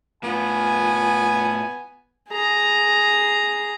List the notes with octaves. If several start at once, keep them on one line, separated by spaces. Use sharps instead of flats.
A2 B3 F4 G#5
G#4 A#5